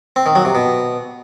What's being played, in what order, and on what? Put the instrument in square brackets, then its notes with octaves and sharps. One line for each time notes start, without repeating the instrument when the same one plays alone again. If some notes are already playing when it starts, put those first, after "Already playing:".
[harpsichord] C4
D#3
F#3
C3
B2